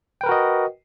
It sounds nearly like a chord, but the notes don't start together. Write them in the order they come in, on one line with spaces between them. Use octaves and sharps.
G5 B4 A#4 F#4 D#5